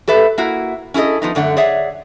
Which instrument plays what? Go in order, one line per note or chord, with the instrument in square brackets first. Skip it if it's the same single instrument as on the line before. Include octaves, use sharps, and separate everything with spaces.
[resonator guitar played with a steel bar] G4 A4 B4 E5
A#3 E4 F#4
C#4 E4 G#4 A4 D#5
F3 B3 D#4
F#2 D3 A3 F#5
G#4 C#5 D5 E5 F#5